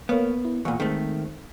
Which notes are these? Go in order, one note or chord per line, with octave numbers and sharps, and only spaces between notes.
A#3 B3 C#5 F5
E4
E2 A#2 F5 F#5 C#6
D#3 G#3 A3 C4